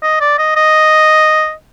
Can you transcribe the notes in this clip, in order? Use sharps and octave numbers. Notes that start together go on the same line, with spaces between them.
D#5
D5
D#5
D#5